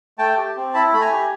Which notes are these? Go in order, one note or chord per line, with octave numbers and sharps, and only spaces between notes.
A3 G5 A5
G4
C4
E4 A5 B5
A3 B5
G#5 A#5
G4